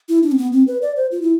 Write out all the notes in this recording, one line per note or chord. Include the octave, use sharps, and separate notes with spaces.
E4
D4
C4
B3
C4
B4
D5
C5
F4
E4